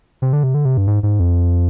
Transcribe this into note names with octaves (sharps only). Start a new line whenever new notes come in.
C3
D3
C3
D3
C3
G2
G#2
G#2
F2